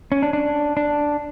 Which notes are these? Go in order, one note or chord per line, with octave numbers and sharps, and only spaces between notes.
C#4
D4
D4
D4